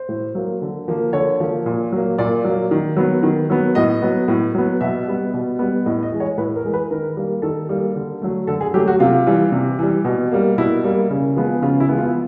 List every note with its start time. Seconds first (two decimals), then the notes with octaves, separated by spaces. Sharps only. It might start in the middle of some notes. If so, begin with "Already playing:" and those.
Already playing: C5
0.09 A2
0.35 F#3 A#3
0.62 D3
0.88 F3 A#3
1.13 D3 C#5
1.40 F3 A#3
1.66 A#2
1.92 F#3 A#3
2.18 A#2 D5
2.44 F#3 A#3
2.71 D#3
2.96 F#3 B3
3.23 D#3
3.50 F#3 B3
3.75 A2 D#5
4.02 F#3 B3
4.28 A2
4.55 F#3 B3
4.81 B2 E5
5.07 G3 B3
5.34 B2
5.59 G3 B3
5.86 A2 D#5
6.03 D#5
6.12 E3 G#3
6.20 C#5
6.38 A2 B4
6.56 A#4
6.65 E3 G#3
6.73 B4
6.91 D#3 A#4
7.17 G3 A#3
7.42 D#3 A4
7.69 G3 A#3
7.96 D3
8.22 F#3 A3
8.47 D3 A4
8.61 G#4
8.74 F#3 A3 G4
8.87 F#4
9.00 C3 F4
9.27 E3 G3
9.52 C3
9.79 E3 G3
10.05 B2
10.31 G3 A#3
10.58 B2 E4
10.84 G3 A#3
11.10 C#3
11.36 F3 G#3 B3
11.62 C#3 F4
11.80 E4
11.89 F3 G#3 B3
11.98 F4